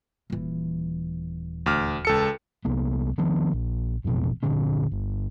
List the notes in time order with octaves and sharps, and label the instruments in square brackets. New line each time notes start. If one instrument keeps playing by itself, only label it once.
[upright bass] D#1 E3
[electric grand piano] D2 D6 F6
C#2 A4 C#7
[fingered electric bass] C2 A#3 B3
D#3 F3 B3 D4
A#1
E1 A1 F2 B2
G1 A#2 D3 C#4
G1